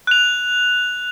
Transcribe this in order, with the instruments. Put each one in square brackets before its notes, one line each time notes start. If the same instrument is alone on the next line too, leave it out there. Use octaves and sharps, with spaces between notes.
[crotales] F#6 F7